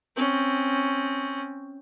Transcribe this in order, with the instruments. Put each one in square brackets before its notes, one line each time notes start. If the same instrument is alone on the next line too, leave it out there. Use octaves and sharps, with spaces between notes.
[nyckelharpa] C4 C#4